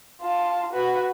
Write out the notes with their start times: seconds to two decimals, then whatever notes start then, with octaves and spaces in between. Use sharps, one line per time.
0.22 F4 A5
0.73 F#4 B4